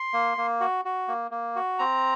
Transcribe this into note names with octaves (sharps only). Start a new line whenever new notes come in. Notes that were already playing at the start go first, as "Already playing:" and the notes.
Already playing: C6
A#3
A#3
F#4
F#4
A#3
A#3
F#4
C4 A#5